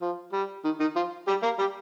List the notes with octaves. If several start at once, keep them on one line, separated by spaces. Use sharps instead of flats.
F3
G3
D#3
D#3 D#4
F3 F4
G3 G4
A#3 A#4
G3 G4